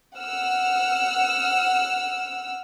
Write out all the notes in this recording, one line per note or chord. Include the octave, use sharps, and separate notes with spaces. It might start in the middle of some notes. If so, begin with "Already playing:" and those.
F#5 E6 F6